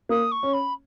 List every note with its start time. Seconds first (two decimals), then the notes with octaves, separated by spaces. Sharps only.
0.09 A#3 D#6
0.31 C#6
0.43 C#4
0.53 B5